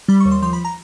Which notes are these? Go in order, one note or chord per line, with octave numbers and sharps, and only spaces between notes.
G3 B5
C#6
D#2
C6
F3 C6
B5
A#5